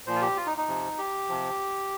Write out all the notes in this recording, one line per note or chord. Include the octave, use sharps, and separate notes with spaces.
A#2 F3 C5
F4
G4
F4
D#4
D#4
C3 F3
G4
C3 F3